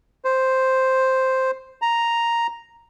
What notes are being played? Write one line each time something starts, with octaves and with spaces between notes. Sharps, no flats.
C5
A#5